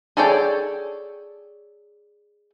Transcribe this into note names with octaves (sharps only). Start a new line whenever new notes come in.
G#4 A4 C#5 D5 G5